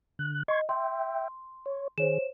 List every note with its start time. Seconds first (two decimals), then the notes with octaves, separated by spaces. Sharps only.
0.19 D3 F#6
0.48 D#5 C6 C#6 G#6
0.69 E5 G5 C6
1.66 C#5
1.98 D#3 G#4 C5 C#5 E7